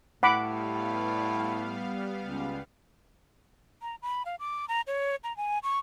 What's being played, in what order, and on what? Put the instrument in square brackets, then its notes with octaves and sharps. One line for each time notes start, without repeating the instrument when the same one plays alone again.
[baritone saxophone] A2 [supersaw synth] G3 B3 F5 [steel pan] F#5 B5 D6
[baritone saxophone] C#2
[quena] A#5
B5
F5
D6
A#5
C#5
A#5
G#5
C#6